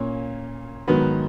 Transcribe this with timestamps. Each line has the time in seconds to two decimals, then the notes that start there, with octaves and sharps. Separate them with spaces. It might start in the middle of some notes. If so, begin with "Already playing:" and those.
Already playing: A#2 A#3 C#4 C#5
0.88 G#2 D#3 F#3 B3 B4